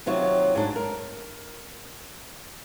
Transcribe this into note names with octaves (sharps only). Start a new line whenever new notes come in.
D#2 C3 F#3 F4 C#5
G#2 D4
A#4